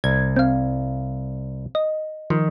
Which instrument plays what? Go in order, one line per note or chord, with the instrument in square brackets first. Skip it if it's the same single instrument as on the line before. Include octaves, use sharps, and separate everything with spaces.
[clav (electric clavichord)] C2 [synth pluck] G#6
[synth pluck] C4 F5
D#5
[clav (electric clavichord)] D#3 [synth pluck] F3